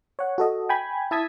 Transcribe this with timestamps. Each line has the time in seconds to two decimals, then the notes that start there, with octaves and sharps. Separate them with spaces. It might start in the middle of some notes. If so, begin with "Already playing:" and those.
0.19 C#5 F#5
0.38 F#4 A4 D#5
0.69 G5 G#5 B5 G#6
1.11 E4 E5 A5 D#6 G#6 B6